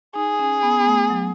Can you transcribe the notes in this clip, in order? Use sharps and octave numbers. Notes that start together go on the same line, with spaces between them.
D#4 G#4
C#4
B3
B3
A3
F#3